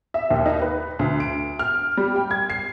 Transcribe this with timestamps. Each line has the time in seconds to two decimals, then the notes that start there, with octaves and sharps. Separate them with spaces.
0.14 E5
0.30 D#2
0.46 D#4
0.62 B4
0.99 D2
1.20 D7
1.59 F6
1.97 G3
2.16 G5
2.31 G#6
2.50 C7